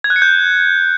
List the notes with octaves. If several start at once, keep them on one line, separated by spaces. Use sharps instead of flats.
G#6
F#6
C#7
G6